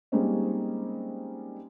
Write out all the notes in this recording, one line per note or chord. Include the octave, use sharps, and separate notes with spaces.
G3 G#3 A#3 C4 C#4 D#4